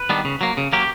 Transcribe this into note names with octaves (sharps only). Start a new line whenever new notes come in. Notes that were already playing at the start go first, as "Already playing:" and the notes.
Already playing: B4
D#3 G3 B3 D4
C#3
F#3 A#3
C#3
F#3 A#3 G4